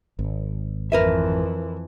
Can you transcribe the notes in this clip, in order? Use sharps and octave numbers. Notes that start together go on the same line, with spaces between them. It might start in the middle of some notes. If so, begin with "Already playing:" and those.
G#1
F2 E3 A#4 B4 E5